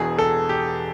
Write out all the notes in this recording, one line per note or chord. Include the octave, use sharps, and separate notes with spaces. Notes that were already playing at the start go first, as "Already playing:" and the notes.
Already playing: E1 E2 B2 G#4
A4
G4